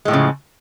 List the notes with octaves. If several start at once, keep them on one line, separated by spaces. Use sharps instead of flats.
A2 C#3 F3 G#3